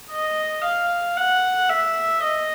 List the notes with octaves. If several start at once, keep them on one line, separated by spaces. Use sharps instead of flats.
D#5
F5
F#5
E5
D#5